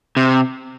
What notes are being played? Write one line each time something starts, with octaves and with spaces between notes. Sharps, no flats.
C3